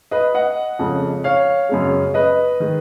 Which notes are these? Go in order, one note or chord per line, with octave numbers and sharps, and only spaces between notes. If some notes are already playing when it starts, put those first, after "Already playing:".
B4 D#5
D#5 F#5
F2 C#3 F3 G#3
C#5 F5
F#2 C#3 G#3
B4 D#5
D#3 G#3